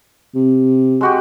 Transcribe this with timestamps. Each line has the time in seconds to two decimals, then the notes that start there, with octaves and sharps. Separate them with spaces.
0.35 C3
1.01 G#3 F#4 G4